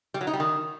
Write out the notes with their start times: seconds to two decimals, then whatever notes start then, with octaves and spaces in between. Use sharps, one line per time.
0.14 G3
0.21 F#3
0.27 D#4
0.33 G3
0.40 D#3